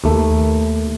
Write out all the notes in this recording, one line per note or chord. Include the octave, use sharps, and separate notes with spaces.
D#2 A3